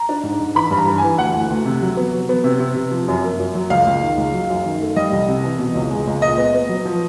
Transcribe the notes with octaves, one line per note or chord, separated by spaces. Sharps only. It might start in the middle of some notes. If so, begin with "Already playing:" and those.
Already playing: A#5
D4
G#2
G#2
E3 B5
G2
A#5
E3
E3 G#5
D2 F#5
D2
D2
C3
F#3
B3
F#3
B3
C3
C3
C3
F3
F#2
A#3
F#2
F#3
C#2 F5
C#2
D#3
C#2
F#3
F#2
D#3
A3
G3 D#5
C2
C3
E3
B2
C#2
G#3
C#2
A#2 D#5
B3
B3
F#3
F3